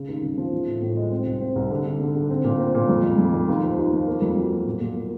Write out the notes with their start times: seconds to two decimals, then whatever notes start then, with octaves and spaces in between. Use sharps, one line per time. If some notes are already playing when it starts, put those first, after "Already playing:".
Already playing: C#3
0.08 D#2
0.23 C#3
0.38 F3
0.52 E3
0.67 A2
0.82 A2
0.97 G#3
1.11 C4
1.26 C2
1.41 C4
1.56 C2
1.71 D3
1.86 D3
2.00 D3
2.15 D3
2.30 C4
2.44 A#2
2.60 C4
2.74 A#2
2.89 F2
3.03 F2
3.18 F2
3.33 F2
3.48 D#2
3.63 F3
3.78 D#2
3.93 F3
4.07 A#3
4.22 F2
4.37 F#3
4.51 F#3
4.66 A#2
4.81 A#2
4.96 A#3